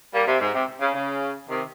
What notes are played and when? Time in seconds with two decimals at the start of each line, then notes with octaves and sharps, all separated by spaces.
0.14 G3 A#3
0.27 C3
0.41 G#2
0.54 C3
0.81 C#3
0.95 C#3
1.49 C3 D#3